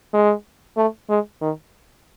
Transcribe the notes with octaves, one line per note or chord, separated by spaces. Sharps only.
G#3
A3
G#3
D#3